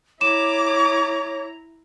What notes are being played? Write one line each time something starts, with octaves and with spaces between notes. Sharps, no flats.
E4 C#5 A#5 D6 E7